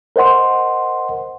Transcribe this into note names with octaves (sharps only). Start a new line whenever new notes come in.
A#4 C5 D#5 F#5 C6